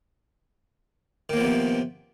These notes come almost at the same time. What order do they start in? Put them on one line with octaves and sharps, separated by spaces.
D#3 A#3 F3 B3 C3